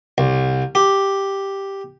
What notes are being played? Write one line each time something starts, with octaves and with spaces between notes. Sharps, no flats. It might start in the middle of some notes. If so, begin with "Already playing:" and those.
C2
G4